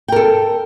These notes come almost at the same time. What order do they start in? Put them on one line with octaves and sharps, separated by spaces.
G5 A#4 A4